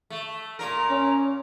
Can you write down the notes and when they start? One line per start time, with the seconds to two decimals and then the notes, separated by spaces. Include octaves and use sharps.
0.10 A3
0.59 A#2 A#4 A#5
0.90 C#4